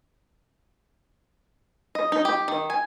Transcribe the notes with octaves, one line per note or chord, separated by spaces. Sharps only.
D#5
D#4
G4
D#3
G#5